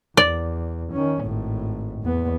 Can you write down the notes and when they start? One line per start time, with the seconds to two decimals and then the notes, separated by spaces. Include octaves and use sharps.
0.17 E2 D5
0.93 D#3 C#4
1.23 G#1 A2
2.03 E2 B3